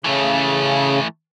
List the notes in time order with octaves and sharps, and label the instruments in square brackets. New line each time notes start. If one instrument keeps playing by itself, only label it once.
[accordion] C#3 [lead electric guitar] E3 A3